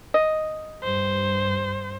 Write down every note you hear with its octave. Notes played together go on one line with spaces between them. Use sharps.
D#5
G2 C5